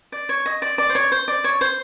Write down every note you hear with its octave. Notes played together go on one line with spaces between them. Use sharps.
D5
C#5
D#5
D5
D5
C5
C#5
C5
D5
C#5
C5